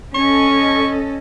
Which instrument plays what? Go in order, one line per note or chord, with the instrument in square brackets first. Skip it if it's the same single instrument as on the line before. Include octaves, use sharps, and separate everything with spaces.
[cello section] C#4 A4 D#5 [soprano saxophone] C#6